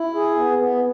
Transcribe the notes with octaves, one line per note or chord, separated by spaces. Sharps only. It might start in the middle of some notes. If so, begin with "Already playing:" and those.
Already playing: E4
G#4
B3
B3